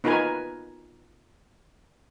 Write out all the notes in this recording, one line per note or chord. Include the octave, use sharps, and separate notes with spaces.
B3 D#4 F4 A#4 B4 G#5